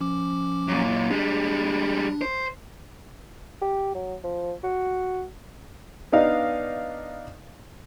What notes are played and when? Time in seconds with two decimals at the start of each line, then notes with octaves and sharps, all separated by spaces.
0.01 F3 C#4 D6
0.68 F#2 A#2
1.10 G3 G#3 D4
2.21 C5
3.62 G4
3.95 F#3
4.24 F3
4.64 F#4
6.12 B3 D4 D#4 D#5 F5